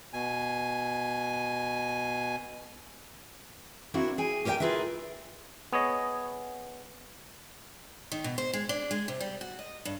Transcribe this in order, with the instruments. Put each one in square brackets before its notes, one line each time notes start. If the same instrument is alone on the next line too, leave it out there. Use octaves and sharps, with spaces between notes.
[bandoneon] B2 G#5
[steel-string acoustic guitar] A#3 C4 D4 E4 F#4
G#4 G5 G#5
G4 A#4 C#5 E5 G5 G#5
E4 F4 G#4 A#4 B4 E5
[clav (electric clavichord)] B3 G#4 C#5 D#5
[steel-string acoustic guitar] D#3
B2
C5
G#3
D4
G#3
C3
G3
F#4
D#5
G2